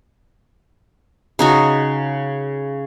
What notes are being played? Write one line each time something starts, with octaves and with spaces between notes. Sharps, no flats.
C#3 D#4 F#4